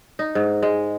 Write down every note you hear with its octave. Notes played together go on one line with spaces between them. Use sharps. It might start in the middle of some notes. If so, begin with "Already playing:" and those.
D#4
G#2
G#3